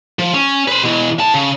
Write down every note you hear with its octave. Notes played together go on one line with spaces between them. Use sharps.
F3
C#4
B4 C5
B2 E3
A2 A5
C#3